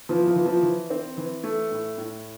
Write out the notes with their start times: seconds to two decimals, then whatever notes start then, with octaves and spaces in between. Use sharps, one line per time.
0.09 E3 F3
0.27 F3
0.36 E3
0.46 F3
0.63 E3
0.90 C4
1.17 E3
1.44 A3
1.71 A2
1.98 A2